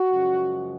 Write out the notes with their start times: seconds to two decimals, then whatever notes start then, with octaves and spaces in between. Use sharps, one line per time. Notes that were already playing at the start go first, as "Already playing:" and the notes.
Already playing: F#4
0.11 F#2 C#3 F3 G#3